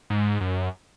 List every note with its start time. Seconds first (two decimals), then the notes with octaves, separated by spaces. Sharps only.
0.10 G#2
0.41 F#2